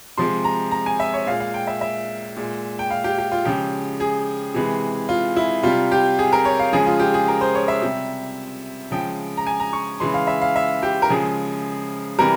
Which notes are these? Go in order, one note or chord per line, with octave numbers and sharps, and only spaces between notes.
C3 F3 G#3 C6
A#5
A#5
G#5
E5
C#5
A#2 G#3 F5
F5
G5
E5
E5
A#2 G#3
G5
F5
G4
G4
F4
C#3 F3 G#3 G4
G#4
C3 E3 G#3
F4
E4
C3 G3 F4
G4
G#4
A#4
C#5
F5
C#3 F3 G#3 G#4
F4
G4
G#4
A#4
C5
C#5
E5
C3 G3
C#3 F3 G#3 G5
A#5
G#5
A#5
C#6
C#3 E3 G#3 C6
F5
E5
F5
E5
G4
A#4
C#3 F3 G#3 G#4
C3 E3 G3 A#4